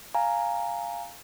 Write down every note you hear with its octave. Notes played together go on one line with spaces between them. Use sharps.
F5 G#5 A#5